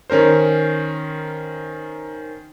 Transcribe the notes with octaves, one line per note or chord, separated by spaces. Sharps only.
D#3 C#4 A#4 C5